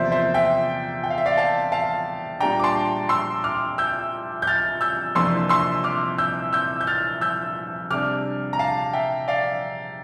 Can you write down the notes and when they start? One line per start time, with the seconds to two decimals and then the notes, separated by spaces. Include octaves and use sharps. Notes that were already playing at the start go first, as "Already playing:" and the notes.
Already playing: E2 C3 F3 A#3 C5 D5 E5
0.12 C5 E5
0.34 E5 G5
1.04 G5
1.10 F5
1.18 E5
1.26 D5 F5
1.37 F5 A5
1.72 F5 A5
2.40 A#2 G3 D4 G5 A#5
2.60 D6
2.64 A5 C6
3.09 C6 E6
3.44 D6 F6
3.78 E6 G6
4.42 G6
4.47 F6 A6
4.81 E6 G6
5.15 F2 C3 E3 A#3 D4 C6 E6
5.49 C6 E6
5.84 D6 F6
6.18 E6 G6
6.53 E6 G6
6.81 G6
6.87 F6 A6
7.21 E6 G6
7.90 C3 G3 D4 D6 F6
8.53 A#5
8.59 F5 A5
8.93 E5 G5
9.28 D5 F5